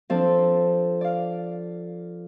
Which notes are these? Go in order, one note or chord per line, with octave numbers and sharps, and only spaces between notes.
F3 C4 D4 A4
D5 F5